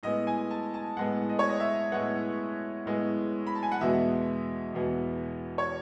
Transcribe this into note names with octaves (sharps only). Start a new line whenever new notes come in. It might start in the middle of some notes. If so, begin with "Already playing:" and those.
A2 G#3 B3 D#5
G#5
A5
A5
A2 G#3 B3 F#5
D#5
C#5
D#5
E5
A2 G#3 B3 F#5
A2 G#3 B3
B5
A5
G#5
F#5
E2 B2 G#3 B3 E5
E2 B2 G#3 B3
C#5